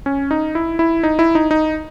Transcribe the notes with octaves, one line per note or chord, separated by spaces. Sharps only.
C#4
D#4
E4
E4
D#4
E4
D#4
D#4